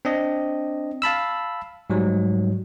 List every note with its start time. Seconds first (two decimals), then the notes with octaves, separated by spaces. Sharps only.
0.05 C4 D4 D#5
1.02 F5 A5 B5 E6
1.90 G#2 F#3 G3